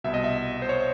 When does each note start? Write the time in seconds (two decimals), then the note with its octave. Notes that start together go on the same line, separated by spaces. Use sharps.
0.04 C2 B2 E5
0.14 D#5
0.24 E5
0.62 C5
0.69 C#5